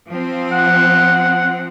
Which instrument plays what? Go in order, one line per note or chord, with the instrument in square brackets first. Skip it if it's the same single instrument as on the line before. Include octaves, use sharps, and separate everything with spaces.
[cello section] F3 C4
[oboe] F#5